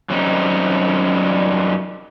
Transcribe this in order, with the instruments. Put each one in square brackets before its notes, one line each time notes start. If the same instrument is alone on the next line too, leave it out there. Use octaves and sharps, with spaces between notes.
[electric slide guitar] F#2 F#3 G3 C4 C#4 D#4